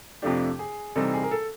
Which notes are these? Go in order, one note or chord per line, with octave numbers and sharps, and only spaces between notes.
F2 C3 F3 A3 D4 G4
G#4
C3 E3 G3 C4 D#4 A4
G#4
A#4
A4